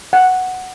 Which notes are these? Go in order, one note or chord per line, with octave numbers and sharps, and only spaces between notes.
F#5